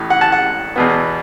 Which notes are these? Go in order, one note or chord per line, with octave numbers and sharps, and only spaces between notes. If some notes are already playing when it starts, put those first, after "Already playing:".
Already playing: A1 A2
F#5
A5
F#5
E2 B2 B3